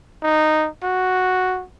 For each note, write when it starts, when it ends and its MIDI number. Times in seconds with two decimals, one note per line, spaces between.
0.22 0.68 63
0.83 1.64 66